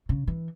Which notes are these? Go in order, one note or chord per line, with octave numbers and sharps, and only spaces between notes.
C#3
E3